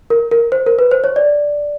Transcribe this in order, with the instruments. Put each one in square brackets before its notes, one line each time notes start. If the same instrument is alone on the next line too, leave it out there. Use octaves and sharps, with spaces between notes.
[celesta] A#4
A#4
C5
A#4
B4
C5
C#5
D5